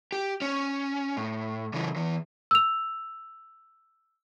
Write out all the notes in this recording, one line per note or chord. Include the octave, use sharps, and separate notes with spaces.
G4
C#4
A2
C#3 E3
E2 E3
E6 F7